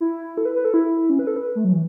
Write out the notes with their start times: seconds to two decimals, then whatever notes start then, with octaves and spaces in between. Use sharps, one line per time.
0.01 E4
0.37 A4
0.45 B4
0.55 B4
0.65 A4
0.74 E4
1.10 C#4
1.19 B4
1.27 A4
1.36 B4
1.55 A3
1.64 F#3
1.73 E3